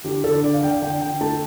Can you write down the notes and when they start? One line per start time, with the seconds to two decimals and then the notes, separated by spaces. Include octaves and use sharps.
0.04 D3 G4
0.24 D3 A4
0.44 D3 D5
0.53 F5
0.62 D3 G5
0.72 D5
0.82 D3 G5
1.01 D3 G5
1.21 A3 A5